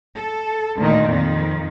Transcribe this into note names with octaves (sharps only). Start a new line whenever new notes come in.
A4
D2 A#2 D#3
F2 D#3